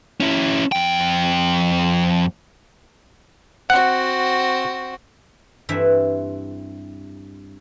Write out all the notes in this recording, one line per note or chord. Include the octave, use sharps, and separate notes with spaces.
C#4 E4
F2 G5
C4 F#4 F#5
G2 E3 C4 E5